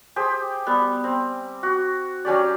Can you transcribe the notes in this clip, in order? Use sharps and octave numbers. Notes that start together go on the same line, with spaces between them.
G4 G#4 C5
G3 B3
C4
F#4
F#3 C#4 G4 D5